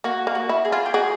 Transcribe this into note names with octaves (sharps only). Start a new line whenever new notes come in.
A#3 F#4
A#3
F#4
E4
G#4
F4
G4
F#4 G#4